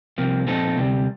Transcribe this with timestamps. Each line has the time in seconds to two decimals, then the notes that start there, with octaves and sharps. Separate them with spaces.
0.18 C2 C3 F3 A#3
0.47 A#2 F3 C4 D#4 A4
0.77 D2 C3 G3